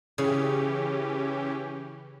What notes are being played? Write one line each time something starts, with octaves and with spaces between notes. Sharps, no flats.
C#3 E3 C#4 G4